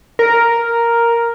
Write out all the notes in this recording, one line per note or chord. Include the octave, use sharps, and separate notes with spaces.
A#4